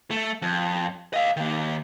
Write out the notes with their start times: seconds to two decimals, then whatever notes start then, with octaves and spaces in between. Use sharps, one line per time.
0.11 A3
0.42 F2
1.14 D#5 F5
1.37 D#3 A#3